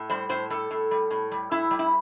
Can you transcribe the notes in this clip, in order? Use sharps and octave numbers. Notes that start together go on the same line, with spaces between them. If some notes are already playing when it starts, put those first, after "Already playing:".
Already playing: A2
G3 C5
A2 C5
G3 A4
A2
G3
A2
G3
A2 E4
G3
E4